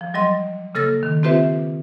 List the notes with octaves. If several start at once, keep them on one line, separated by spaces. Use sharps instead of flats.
F3
F#3 G3 D#5 C6
C#3 A#3 A4 E6 A6 A#6
D#3
C4 F4 G4 B4 C5 E5